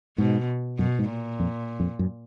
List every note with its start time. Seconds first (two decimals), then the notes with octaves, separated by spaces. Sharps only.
0.18 G#2 B2
0.79 F#2 B2
0.99 G#2
1.09 A#2
1.40 F2
1.80 F2
1.99 F#2